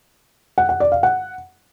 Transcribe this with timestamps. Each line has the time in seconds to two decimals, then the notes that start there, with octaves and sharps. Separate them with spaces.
0.58 F#5
0.69 F#5
0.80 D5
0.92 F5
1.03 F#5